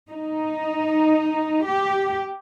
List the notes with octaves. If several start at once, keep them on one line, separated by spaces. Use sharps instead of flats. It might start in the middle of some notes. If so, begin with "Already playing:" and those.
D#4
G4